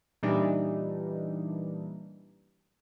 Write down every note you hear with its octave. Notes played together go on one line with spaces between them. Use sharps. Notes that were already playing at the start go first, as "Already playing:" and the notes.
A#2 E3 G3 D4 D#4